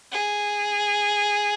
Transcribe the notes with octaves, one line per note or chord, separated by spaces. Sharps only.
G#4